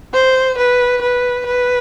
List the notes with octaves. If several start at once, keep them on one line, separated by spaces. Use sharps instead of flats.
C5
B4
B4
B4